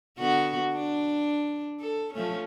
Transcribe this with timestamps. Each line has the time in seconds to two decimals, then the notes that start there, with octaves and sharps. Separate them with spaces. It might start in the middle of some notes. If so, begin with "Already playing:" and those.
0.18 D3 B3 F#4
0.74 D4
1.80 A4
2.13 F3 A3 C#4